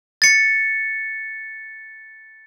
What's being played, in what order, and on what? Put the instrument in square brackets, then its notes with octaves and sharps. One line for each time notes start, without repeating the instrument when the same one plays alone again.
[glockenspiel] A6 C#7